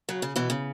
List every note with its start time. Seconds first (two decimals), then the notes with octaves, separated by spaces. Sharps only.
0.09 C#3 F#3
0.22 C#3
0.36 B2 E3
0.50 C#3